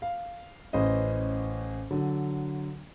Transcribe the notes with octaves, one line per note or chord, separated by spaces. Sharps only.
F5
A1 C#4 B4 C5 D#5
D3 F#3